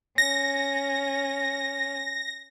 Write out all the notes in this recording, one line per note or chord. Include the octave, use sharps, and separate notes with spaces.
C#4 A#6